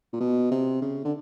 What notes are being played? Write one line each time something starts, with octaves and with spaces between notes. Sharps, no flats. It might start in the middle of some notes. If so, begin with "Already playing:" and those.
A#2
B2
C3
C#3
D3